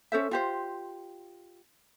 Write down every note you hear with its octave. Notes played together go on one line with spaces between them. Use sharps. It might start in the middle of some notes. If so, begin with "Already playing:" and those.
C#4 A4 C5 E5
F4 G4 C5